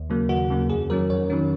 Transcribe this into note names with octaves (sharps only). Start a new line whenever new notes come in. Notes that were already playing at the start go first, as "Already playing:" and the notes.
Already playing: D#2
C#3 F#3 A#3
D#2 F#4
C#3 F#3 A#3
F2 G#4
D#3 F#3 C#4 A#4
F2 C#5
D#3 F#3 C#4